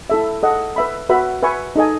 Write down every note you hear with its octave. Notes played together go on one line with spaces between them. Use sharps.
E4 A4 E5
A4 D#5 F#5
B4 E5 B5
F#4 B4 E5 B5
B4 E5 G#5 C#6
D#4 A4 D#5 G#5